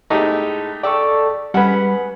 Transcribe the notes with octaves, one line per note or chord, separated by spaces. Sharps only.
A2 G#3 A3 D#4 G4
A4 D5 G5 C#6
G3 G#3 B3 C#4 B4 F#5